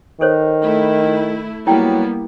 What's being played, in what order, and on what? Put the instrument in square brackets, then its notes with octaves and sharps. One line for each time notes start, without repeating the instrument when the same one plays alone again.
[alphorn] D#3 [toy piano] A4 C5 C#5
[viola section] A3 E4
[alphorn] F#3 [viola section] G3 A#3 B3 [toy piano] E4 G5